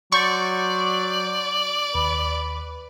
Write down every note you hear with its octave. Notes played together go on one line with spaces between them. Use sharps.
F#3 D5 C6 C#6 G6 A6
D#2 B4